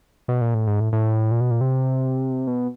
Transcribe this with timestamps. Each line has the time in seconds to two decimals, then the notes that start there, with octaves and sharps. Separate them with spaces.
0.28 B2
0.41 A#2
0.54 A2
0.67 G#2
0.80 A2
0.93 A2
1.31 A#2
1.41 B2
1.51 A#2
1.61 C3
2.47 B2